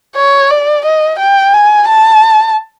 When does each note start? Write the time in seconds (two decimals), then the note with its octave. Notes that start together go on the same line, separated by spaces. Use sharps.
0.16 C#5
0.50 D5
0.85 D#5
1.19 G5
1.53 G#5
1.89 A5